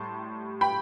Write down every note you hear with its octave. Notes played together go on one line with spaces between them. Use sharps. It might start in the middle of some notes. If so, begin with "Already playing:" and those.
Already playing: A2 G3 A5 C6
G5 B5